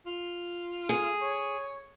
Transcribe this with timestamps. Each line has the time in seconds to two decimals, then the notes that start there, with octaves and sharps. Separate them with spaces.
0.06 F4
0.89 G#4
1.22 C#5